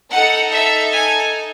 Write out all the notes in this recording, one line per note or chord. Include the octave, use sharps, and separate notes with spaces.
D#4 A4 F#5
E5
G#5